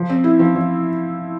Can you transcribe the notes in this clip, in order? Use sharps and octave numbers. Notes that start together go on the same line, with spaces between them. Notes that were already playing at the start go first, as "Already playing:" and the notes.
Already playing: F3
C4
E4
F3
F3